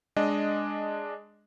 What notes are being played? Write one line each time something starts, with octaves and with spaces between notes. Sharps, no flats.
G#3 D4 D#5